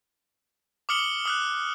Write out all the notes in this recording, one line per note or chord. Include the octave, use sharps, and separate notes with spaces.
D6 D#6 F6 C#7 F#7 G7
D#6 F6 F#6